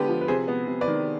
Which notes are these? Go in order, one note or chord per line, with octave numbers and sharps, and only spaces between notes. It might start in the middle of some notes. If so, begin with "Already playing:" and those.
Already playing: D3 G#3 B3 G4 B4
F3
B4
C3 G#4 C5
B3
C3
B4 D5
D#3